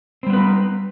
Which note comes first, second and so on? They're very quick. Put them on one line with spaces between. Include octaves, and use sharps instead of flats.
C4 G3 B3 B4 D#4